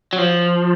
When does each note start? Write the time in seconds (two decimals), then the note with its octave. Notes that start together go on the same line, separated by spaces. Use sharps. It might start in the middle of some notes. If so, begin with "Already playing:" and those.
0.13 F#3
0.18 F3